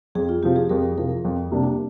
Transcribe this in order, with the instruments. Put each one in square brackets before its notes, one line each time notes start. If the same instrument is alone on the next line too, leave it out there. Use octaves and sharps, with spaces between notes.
[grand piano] F2 [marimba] G#4
[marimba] F4
[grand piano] C3 F3 [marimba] G4
[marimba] G#4
[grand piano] F2 [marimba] A#4
[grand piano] C3 F3 [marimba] A#4
[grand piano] F2
C3 G3 A#3 D4